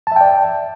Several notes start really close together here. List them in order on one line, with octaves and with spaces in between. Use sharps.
A5 E5 G5 D5